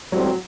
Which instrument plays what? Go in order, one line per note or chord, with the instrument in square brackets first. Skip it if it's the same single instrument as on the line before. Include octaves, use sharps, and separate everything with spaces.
[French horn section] A2 G3 C4 [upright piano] F#3
[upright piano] F#3